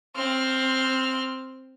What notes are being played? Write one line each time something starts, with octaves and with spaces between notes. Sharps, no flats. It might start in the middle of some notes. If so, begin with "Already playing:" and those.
C4 F6